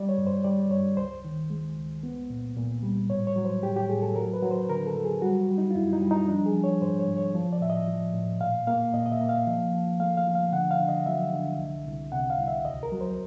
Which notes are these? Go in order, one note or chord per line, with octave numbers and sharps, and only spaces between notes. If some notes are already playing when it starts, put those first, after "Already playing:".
Already playing: G3 D5
C#5
G2
C5
G3 D5
G2 C#5
C#2 C5
D#3
G#3
C#2
B3
A#2
A#2
G3
A2 C#5
C#5
F#3
C5
A2 G4
G4
A2 G#4
A4
F#3 A#4
B4
F#3
C5
D3 A#4
A4
F#3
G#4
G3 F#4
G3
D#4
F4
F#2 E4
D#4
G3
D#4
F3 D4
G#4
F3
C#5
G#2 C5
C#5
G#2
C#5
F3
D5
A2 E5
D#5
F3
A2
A#2 F5
A#3 F5
A#2 D#5
D#5
E5
A#3
F5
F3
F3
A3 F5
F5
F3
F5
D3 F#5
F5
D3
D#5
F#3 E5
D3
C2
C2
C3 F#5
F5
C2
E5
D2 D#5
A#4
F#3
C5